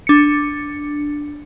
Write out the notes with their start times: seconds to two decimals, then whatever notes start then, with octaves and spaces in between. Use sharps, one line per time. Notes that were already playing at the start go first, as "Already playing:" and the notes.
0.07 D4 C#7